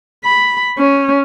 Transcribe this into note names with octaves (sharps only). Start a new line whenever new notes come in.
B5
C#4